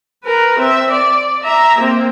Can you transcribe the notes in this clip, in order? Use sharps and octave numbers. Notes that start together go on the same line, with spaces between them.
A#4 B4
C4 E5
D5
E5 A#5
A#3 C4